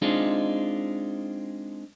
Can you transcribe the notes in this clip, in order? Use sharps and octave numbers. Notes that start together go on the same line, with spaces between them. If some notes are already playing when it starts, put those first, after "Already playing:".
G#3 C4 D4 D#4 F4